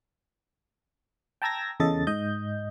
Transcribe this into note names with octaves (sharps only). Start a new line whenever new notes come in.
G5 A5 A#5 E6 G#6 A#6
E2 C#3 A4 D#5 A6
G#2 D#5 G6